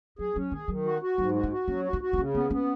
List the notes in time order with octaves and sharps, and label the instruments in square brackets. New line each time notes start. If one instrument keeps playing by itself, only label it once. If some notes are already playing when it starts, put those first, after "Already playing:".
[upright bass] F#3 [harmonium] G#4
[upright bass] F#3 [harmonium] C#4
[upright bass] D#3 [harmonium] G#4
[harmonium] D#3 [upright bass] F#3
[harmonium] F#4
F#4
[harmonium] G#2 [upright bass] F#3
[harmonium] F#4
[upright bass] D#4
[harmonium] F#4
[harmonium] F#3 [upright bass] C#4
[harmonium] F#4
[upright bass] D#4
[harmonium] F#4
[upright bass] D#4
[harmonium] C#3 [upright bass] C#4
[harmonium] B3 [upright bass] C#4
[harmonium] B3 [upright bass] C#4